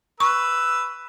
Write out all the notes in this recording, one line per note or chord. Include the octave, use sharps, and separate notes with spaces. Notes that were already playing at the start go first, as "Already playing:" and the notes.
B4 C#6 E6